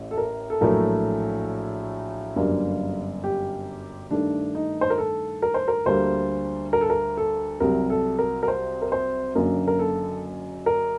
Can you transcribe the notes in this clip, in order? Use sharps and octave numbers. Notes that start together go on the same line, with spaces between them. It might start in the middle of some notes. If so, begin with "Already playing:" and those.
Already playing: A1 A2
A4
A#4
A4
A#1 A2 F#3 A3 A#4
G1 F#2 D3 G3 A#3
G4
G2 D#3 A3 D4
D#4
C5
A#4
A4
A#4
C5
A#4
D2 D3 G3 A#3 C5
A#4
A4
A#4
A4
C2 C3 F#3 A#4
A4
A#4
A#4
C5
A#4
C5
F#1 F#2 D3 F#3 A#3 A#4
A#4
A4
A#4